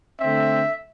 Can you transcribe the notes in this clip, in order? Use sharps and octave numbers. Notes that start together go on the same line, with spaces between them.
D3 A3 C4 E5